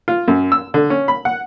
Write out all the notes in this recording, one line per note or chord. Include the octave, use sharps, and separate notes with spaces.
F4
F#2
E6
D3
C#4
B5
F#5